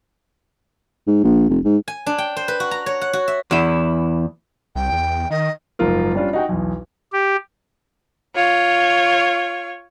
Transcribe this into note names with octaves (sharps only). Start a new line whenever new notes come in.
G#2
A#1
F1
G#2
G#5
D4
G5
C5
B4
F#4
A#5
C#5
F#5
F#4
E5
E2 E4
C2 G5
E2
D#3 D#5
F#1 G#2 F3 F4 A#4
G3 C#4 D4 F4
D#4 F#4 G5
B1 E2
G4
F4 C#5